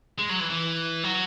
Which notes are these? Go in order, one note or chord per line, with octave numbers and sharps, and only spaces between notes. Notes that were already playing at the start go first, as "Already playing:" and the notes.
G#3
F#3
E3
E3
F#3